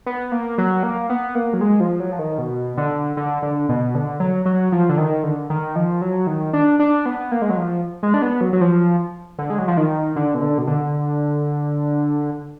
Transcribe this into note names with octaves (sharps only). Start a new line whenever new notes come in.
B3
A#3
F#3
A#3
B3
A#3
F#3
G#3
F3
F#3
F3
D#3
B2
D3
D3
D3
B2
D3
F#3
F#3
F3
D3
D#3
D3
D#3
F3
F#3
D#3
D4
D4
B3
A#3
G#3
F#3
F3
G#3
D4
B3
F#3
F#3
F3
D3
G#3
F#3
F3
D#3
D3
B2
D3
B2
D3